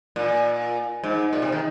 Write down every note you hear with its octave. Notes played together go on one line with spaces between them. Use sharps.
A#2
G#2
A#2
C3
D#3